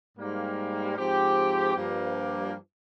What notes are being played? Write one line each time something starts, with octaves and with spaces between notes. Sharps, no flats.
G#2 G3 A#3
G#2 F3 C4 G4
G2 F3 A#3